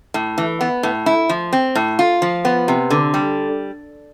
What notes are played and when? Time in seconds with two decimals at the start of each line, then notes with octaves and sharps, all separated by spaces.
0.14 A2
0.38 E3
0.61 B3
0.83 A2
1.06 E4
1.29 F3
1.53 C4
1.75 A2
1.99 F4
2.22 F3
2.45 B3
2.68 C3
2.90 D3
3.14 G3